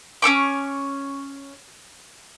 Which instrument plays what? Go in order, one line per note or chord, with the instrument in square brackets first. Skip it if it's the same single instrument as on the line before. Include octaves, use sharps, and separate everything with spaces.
[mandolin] C#4 A4 C#6 D6